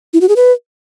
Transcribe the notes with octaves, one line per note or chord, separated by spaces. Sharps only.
E4
F#4
G#4
B4